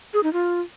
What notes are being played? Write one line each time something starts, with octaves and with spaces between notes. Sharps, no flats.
G#4
D#4
F4